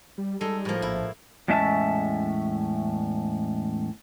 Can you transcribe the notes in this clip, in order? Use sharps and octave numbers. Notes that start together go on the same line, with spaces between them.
G3
G3 G#3 D#4 A4
A2 F3 A#3
A#1 E4
E2 A2 G#3 C#4 E5 A5